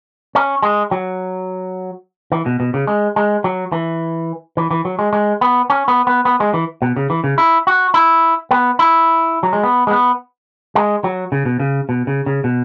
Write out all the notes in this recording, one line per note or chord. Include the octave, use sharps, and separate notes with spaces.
C#4
G#3
F#3
E3
B2
B2
C#3
G#3
G#3
F#3
E3
E3
E3
F#3
G#3
G#3
B3
C#4
B3
B3
B3
G#3
E3
B2
C#3
E3
C#3
E4
F#4
E4
B3
E4
F#3
G#3
B3
G#3
B3
G#3
F#3
C#3
B2
C#3
B2
C#3
C#3
B2